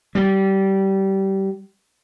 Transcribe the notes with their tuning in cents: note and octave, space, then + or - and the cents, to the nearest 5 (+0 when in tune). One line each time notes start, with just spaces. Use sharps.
G3 -20